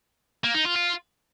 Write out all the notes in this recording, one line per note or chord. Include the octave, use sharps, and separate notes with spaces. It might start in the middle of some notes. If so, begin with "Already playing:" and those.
A#3
D#4
F4
F4